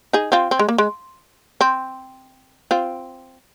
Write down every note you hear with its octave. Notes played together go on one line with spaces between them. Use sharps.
D#4 G#4
C4 F4
C4
G#3
A#3
G#3
C4
C4 F4